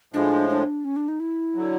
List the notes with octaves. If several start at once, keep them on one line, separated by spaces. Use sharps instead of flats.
A2 F3 G#3 D4
D4
C#4
D4
D#4
E4
D3 F#3